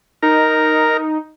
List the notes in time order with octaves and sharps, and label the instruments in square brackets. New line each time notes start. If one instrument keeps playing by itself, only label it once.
[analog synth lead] D#4 [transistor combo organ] A#4